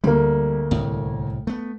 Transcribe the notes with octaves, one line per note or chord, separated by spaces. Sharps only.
D2 G3 A#3
C2 A2
A3 B3